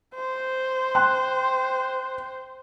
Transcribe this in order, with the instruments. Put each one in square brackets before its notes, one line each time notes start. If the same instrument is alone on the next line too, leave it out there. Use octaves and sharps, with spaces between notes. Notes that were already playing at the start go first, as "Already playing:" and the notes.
[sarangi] C5
[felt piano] G5 C6 F#6